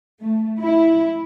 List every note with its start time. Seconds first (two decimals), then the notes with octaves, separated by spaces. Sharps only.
0.21 A3
0.61 E4